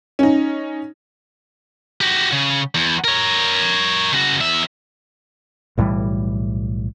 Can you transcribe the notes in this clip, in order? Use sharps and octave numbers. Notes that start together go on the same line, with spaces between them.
C#4 D#4
F#4 G4
C#3
E2
A#4 C#5
C#3 F#4
E2 E5
B1 A2 E3 G3